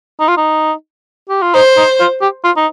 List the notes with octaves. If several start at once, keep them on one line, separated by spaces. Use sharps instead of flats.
D#4
F4
D#4
G4
F4
D#4 C5
D#4
F4
G4
F4
D#4